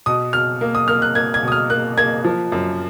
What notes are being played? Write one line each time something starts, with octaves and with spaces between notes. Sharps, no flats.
B2 D#6
B2 F6
A#3
D#6
A#3 F6
F#6
A#3 G#6
G#6
B2 D#6
F6
A#3 F#6
A#3 G#6
F3
F#2